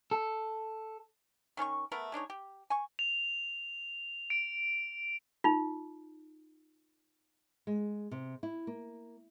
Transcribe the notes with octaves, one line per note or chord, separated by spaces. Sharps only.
A4
D#3 C#4 E4 C#6
A3 B3 A#4
G#3 D4 D#4 C#5
G4
G#5 C#6
F7
D7
D#4 F4
G#3
C3
E4
A#3